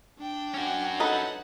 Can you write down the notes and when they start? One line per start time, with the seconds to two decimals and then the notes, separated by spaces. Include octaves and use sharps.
0.19 D4 G5
0.54 C#4 F#4
1.00 D#4 A4 B4 F#5